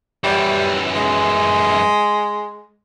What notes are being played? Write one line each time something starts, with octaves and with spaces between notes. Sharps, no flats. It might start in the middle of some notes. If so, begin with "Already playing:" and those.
F#2 E3 G3
G#3